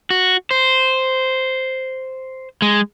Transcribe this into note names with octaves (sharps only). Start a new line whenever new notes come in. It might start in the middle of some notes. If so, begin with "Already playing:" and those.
F#4
C5
G#3